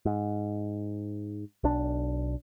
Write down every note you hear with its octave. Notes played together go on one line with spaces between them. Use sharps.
G#2
B1 D4